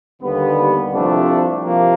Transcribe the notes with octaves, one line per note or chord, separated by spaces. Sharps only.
D#2 D3 G3 B3
C2 C3 F3 A3 D4
C3 F3 A#3